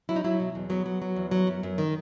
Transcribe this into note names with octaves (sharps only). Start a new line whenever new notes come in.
F#3 E4
D#4
F#3 E4
B2
E2
F#3 B3
F#3
F#3
E2
F#3
F#2
F#2
D#3